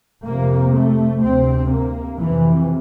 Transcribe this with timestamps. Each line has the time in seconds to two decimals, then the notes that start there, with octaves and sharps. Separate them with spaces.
0.25 F2 C3 A#3
0.74 A3
1.22 D2 C3 C4
1.71 A#3
2.19 F2 C3 E3